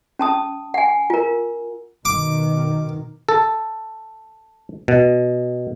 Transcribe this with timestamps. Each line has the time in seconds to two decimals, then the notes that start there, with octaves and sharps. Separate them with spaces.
0.19 C#4 A5 D#6
0.74 F#5 G#5
1.10 F4 A#4
2.05 B2 D#3 D6
3.29 A4
4.88 B2